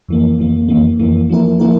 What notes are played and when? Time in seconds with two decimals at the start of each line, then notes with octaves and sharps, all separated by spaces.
0.09 F2 E3 A#3
0.39 F2 E3 A#3
0.68 F2 E3 A#3
0.99 F2 E3 A#3
1.30 F3 A#3 E4 A#4
1.60 F3 A#3 E4 A#4